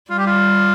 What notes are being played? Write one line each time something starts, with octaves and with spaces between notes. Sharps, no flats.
G3 F4
G4
F4